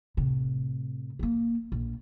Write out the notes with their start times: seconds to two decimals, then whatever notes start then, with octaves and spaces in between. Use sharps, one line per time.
0.17 A2 C3
1.19 A#3 B3
1.72 A#1